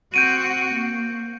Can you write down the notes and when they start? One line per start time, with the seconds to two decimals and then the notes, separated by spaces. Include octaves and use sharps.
0.14 C4 F#4 G6 D7 D#7
0.73 A#3